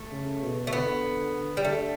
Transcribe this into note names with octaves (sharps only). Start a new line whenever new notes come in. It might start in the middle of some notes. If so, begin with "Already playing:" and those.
Already playing: A3
C#3
B2
A3
D3 B3
G3
D3 A3